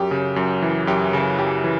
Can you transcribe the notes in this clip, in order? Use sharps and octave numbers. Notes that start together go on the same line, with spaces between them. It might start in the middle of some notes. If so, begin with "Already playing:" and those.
Already playing: F#2 G4
C#3
F#2
E3
F#2 G4
C#3
F#2 G4
E3